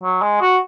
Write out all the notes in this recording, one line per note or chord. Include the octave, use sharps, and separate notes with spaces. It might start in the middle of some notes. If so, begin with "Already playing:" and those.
F#3
G#3
F#4